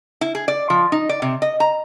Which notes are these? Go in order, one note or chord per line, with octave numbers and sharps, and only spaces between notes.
E4
G#4
D5
F3
D#4
D5
C3
D#5
A#5